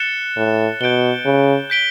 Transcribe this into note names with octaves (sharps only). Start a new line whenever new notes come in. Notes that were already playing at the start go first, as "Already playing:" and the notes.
Already playing: F#6 A6 C#7 E7 G7
A2
B2 G6 D7 G7
C#3
G6 B6 D7 G7